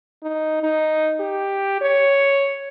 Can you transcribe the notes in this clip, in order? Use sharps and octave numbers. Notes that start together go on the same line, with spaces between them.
D#4
D#4
G4
C#5